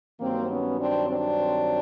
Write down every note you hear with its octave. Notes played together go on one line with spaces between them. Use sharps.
G2 D#3 F#3 A#3 C4
B3 C#4
C4 D4
C4 D4